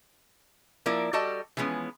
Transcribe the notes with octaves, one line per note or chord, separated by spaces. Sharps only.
F3 A#3 E4 A#4 D5
G3 F#4 A4 D5 D#5 A5
E3 F3 G#3 B3 C#4